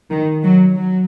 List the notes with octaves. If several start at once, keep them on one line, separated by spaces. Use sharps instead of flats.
D#3
F#3
F#3